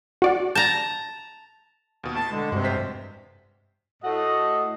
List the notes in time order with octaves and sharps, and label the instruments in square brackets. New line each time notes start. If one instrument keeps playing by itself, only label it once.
[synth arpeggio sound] F#4 D5 F#5
[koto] A5 A#5 [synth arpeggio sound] G6
[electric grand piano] D#2 B2
[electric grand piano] A2 [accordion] A5
[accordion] D3 [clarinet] G#3
[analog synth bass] G2 [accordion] C3 [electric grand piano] F#4 C5
[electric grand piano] A1 C5 B6
[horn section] A2 A3 F#4 D#5